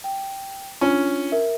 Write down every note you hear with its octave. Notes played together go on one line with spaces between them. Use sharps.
G5
C#4 D4 F4
A#4 E5